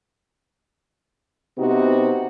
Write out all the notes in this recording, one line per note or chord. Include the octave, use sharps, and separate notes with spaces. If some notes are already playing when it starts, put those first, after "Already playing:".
C3 B3 C4 D#4 F#4 G4